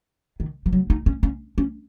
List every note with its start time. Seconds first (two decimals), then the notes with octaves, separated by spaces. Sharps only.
0.40 D#3
0.66 F3
0.73 F#3
0.90 D#4
1.06 C#4
1.23 C#4
1.58 C#4